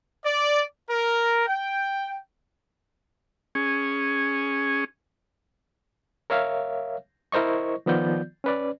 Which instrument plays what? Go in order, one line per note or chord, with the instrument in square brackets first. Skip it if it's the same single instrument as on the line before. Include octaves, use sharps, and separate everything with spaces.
[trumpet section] D5
A#4
G5
[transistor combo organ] C#4 G#4
[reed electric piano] A#4 C#5 E5 F5
E4 A#4 C5 D#5 C#6
D#3 F3 B3 F4 D5 G6
C#4 B4 D5